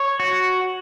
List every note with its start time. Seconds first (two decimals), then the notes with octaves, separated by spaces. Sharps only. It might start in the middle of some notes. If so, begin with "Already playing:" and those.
Already playing: C#5
0.20 F#4